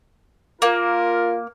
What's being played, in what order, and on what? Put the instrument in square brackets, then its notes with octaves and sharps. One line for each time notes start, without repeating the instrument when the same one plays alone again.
[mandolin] A#3 [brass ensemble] F4 A#4